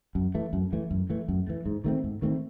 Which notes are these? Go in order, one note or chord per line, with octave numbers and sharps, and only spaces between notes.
F#2
E3 A3
F#2
E3 A3
F#2
E3 A3
F#2
E3 A3
G#2
D#3 A3 C4
G#2
D#3 A3 C4